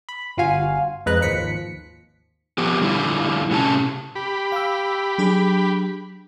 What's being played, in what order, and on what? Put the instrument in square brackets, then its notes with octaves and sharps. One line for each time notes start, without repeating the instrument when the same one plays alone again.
[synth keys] B5
G1 F4 F#4 F5 G#5
F2 G#3 B4 A#5 F#6
G#1 D#2 F3 B6 C#7
[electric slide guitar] F3 B3 G4
D3 G3 E4 F4
A2 C3 A3 C#4 A4 A5
[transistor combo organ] G4 B5
[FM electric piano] F5 E6
F#3 D4 G#4